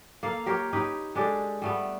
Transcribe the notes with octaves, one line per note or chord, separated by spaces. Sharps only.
A#3 A4 F5
G4 A#4 C5 C#5
D#4 G4 B4 C#5
G#3 D4 G4 A4
G3 A3 B3